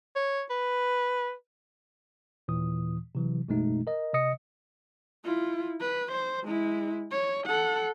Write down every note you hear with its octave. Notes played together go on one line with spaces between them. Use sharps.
C#5
B4
D#2 A#2 E3 D#6
C3 E3 F#3
A1 F#2 B2 G#3 A3 D#4
A#4 D#5
C3 D#5 D#6 C#7
E4 F4
B4
C5
G#3 E4
C#5
A4 F#5